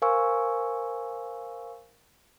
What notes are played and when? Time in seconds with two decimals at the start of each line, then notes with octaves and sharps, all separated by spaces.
0.02 A#4 C5 F5 G#5 C#6 E6